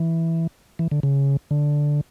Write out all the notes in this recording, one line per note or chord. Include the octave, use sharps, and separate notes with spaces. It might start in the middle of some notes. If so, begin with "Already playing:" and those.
Already playing: E3
E3
D3
C#3
D3